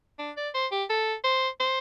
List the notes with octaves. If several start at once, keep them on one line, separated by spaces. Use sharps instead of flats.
D4
D5
C5
G4
A4
C5
C5